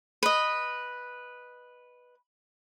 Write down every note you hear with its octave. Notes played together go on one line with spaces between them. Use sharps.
B4 D#5